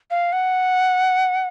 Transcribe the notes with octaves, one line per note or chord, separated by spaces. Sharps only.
F5
F#5